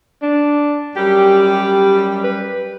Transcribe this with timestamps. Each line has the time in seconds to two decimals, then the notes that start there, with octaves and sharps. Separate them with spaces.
0.22 D4
0.96 F#2 G3 G4
2.24 B4